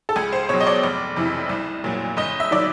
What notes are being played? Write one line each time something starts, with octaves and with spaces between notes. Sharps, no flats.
A4
C#2 G#4
C5
B2 F#3 C#5
D#5
D5
F1
F2 C3 E3
C2
A#2 F#3
G1 D#5
E5
D#3 F#3 D5